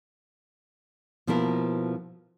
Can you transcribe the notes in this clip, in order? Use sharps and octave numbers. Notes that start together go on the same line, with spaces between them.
B2 F3 A#3 E4 A#4